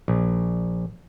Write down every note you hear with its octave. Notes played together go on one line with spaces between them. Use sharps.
A#1